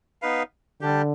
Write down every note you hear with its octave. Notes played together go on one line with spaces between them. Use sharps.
B3 D#4 B4 F5
D3 G3 D4 G4